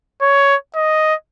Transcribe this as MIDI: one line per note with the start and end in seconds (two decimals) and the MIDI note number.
0.22 0.56 73
0.75 1.15 75